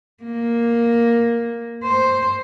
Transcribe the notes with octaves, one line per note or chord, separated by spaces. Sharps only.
A#3
C5